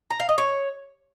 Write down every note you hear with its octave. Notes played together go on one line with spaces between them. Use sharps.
A#5
F5
D#5
C#5